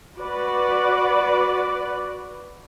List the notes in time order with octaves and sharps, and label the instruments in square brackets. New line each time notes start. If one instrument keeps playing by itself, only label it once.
[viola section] F#4 B4 D5